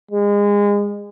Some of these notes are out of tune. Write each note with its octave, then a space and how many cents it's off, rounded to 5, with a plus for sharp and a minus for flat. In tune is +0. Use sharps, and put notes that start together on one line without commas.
G#3 -30